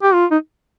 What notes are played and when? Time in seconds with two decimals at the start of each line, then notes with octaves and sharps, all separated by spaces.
0.03 G4
0.13 F4
0.31 D#4